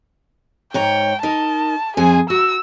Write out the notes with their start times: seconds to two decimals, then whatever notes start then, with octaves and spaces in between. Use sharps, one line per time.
0.74 G#2 C#5 G5 A#5
1.23 D#4 A#4 D#5 A5
1.97 F2 G#4 C5 G#5
2.30 F#4 E6